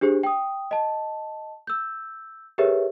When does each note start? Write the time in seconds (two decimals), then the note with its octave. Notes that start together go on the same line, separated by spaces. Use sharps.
0.01 D4 G4 G#4 C5
0.23 G5 D#6
0.71 D#5 A5
1.67 E6 G6
2.58 G4 G#4 A#4 B4 C#5 E5